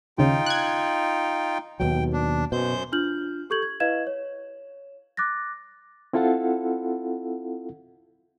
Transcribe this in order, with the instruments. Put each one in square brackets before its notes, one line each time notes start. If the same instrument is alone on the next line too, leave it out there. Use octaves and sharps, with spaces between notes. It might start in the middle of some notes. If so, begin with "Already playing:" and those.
[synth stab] D#2 C#3 [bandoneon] D#4 F4 G5
[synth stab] F#6 G#6
[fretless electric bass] D#2 B2 F#3 [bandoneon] G5
[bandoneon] D4
[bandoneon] F#2 C5 G6 [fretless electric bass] B2
[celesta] D4 F4 F6 G6 F#7
G4 A4 C#6 G6 G#6 F#7
G#6
E4 B4 D#5 F5 G#6 E7
C#5
D6 F#6 A6 A#6
[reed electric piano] C4 E4 F4 A4 F5 F#5